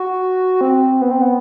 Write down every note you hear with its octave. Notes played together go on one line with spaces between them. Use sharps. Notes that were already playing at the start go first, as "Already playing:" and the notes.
Already playing: F#4
C4
B3
C4
B3